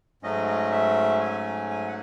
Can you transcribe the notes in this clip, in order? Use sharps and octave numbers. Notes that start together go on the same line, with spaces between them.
G#2 F#3 A3 C#4 D#5
D#5
E5
G#5
G#5
F#5